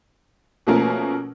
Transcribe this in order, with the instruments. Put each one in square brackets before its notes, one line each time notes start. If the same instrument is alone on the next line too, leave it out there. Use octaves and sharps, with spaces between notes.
[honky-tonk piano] B2 F3 A3 A#3 C#4 A#4